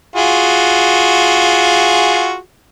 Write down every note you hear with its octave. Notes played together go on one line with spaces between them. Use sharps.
F4 F#4 G#4